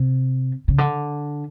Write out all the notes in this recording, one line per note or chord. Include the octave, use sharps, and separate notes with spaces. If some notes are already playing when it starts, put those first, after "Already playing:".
Already playing: C3
C#3
D3